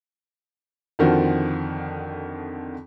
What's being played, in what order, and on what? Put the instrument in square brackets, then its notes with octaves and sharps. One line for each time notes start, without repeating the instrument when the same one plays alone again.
[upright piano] F2 D3 D#3 F3 F#4